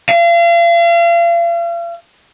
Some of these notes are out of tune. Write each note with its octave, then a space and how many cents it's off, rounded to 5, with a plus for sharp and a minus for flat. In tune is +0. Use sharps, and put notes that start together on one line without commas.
F5 -40